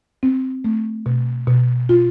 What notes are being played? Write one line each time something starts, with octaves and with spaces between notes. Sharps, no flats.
C4
A3
B2
B2
F4